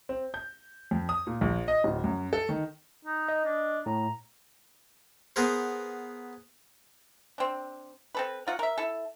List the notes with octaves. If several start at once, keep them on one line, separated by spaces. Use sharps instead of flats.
C4
G6
F2
D#6
A#2
A#1
D#5
D1
F#2
A4
D#3
D#4
D#5
D4
A2 A#5
B3 G#4 A#4 C5
C4 D4
C4 A4 B4
F#3 F4 F#5
A#4 E5
E4 A4